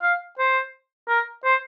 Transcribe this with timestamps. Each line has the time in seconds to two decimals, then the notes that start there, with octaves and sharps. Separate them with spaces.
0.02 F5
0.39 C5
1.09 A#4
1.44 C5